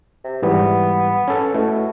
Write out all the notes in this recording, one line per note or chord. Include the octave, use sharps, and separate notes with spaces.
C3
G#2 E3 G3 B3
C#4 A4
B2 A3 E4